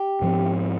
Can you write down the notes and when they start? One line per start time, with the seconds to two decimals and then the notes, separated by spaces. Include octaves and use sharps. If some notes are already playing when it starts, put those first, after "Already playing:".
Already playing: G4
0.22 G#2 F3 C4